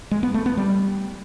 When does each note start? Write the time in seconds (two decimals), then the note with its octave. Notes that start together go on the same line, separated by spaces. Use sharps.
0.11 G#3
0.23 B3
0.34 A3
0.46 B3
0.57 G3